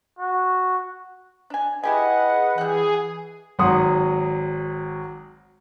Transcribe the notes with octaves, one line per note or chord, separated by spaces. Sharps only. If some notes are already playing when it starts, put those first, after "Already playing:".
F#4
D4 G#5
E4 G4 G#4 B4 D#5 F#5 G#5
E3 G3 G#4 F#5
G#1 F#3 F#5 C6 D#6